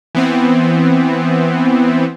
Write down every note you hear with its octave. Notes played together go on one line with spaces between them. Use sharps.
E3 B3 C4